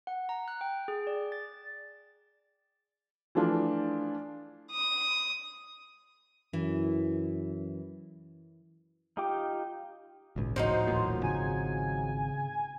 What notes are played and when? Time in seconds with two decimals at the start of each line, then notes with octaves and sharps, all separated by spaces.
0.07 F#5
0.29 A#5
0.48 F#6
0.61 G5
0.88 G#4
1.07 D5
1.32 A6
3.35 E3 F3 A3 D4 F4
4.71 D#6
6.53 F#2 E3
9.17 D#4 F4 G4 G5 D6
10.36 G#1 C#2 A#2
10.56 A2 F3 F#3 D#4 C5
10.87 D#1 A1 A#2
11.23 G#1 C#3 G#5